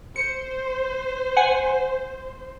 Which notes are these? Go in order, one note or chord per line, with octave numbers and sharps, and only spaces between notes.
C5 C#7
F#5 G#5